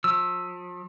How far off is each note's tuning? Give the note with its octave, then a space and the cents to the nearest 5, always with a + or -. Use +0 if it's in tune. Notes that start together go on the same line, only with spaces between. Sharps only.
F3 +40 E6 +0